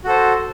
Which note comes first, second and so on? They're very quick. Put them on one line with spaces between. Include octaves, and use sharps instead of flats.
F#4 A4 C5